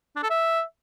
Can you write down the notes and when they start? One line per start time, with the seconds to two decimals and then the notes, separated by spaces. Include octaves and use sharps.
0.16 D4
0.23 A4
0.30 E5